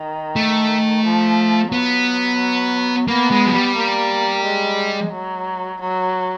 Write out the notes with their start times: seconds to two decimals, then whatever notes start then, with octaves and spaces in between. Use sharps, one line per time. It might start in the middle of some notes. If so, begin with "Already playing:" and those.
Already playing: D#3
0.36 A3
1.04 F3
1.72 F#3 B3
3.08 A#3 B3
3.31 G#3
3.46 F#3
3.54 G3
3.76 A#3
4.44 G#3
5.12 F#3
5.81 F#3